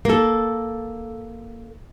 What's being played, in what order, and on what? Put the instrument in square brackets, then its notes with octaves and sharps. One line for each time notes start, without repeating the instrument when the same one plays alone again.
[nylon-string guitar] A#3 A4